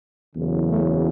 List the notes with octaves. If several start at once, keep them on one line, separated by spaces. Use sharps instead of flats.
F#1 E2 C#3 F#3
A3